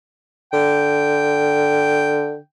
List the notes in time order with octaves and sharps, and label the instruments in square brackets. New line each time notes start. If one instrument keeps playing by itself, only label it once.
[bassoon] D3 [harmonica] G5